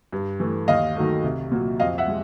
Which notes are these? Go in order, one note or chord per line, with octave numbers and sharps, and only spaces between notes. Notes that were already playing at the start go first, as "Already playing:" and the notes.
G2
E3 A3
D#2 D#5 F5
D#3 F#3 A3
C2
A#2 F#3
F2 D#5 F5
E5 F#5
G#3